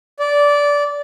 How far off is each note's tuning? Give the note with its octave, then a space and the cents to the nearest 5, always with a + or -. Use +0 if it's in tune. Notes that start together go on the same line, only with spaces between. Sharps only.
D5 -15